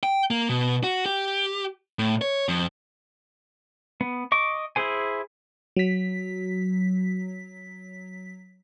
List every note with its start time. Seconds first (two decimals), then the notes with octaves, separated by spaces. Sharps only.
0.03 G5
0.31 A#3
0.49 B2
0.84 F#4
1.06 G4
1.99 A2
2.21 C#5
2.49 F2
4.01 B3
4.32 D#5 C#6 D6
4.76 E4 G#4 C5 G#5
5.76 F#3 B6